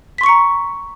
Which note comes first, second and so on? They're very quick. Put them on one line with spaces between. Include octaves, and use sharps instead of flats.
B6 C6 C#6 C#7 A#5